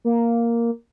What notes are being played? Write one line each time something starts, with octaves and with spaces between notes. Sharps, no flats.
A#3